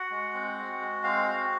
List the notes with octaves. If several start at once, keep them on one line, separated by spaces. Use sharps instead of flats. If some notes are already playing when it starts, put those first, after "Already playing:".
Already playing: F#4 F#5
G#3
C4
F#4
G#3
C4 F5
F#4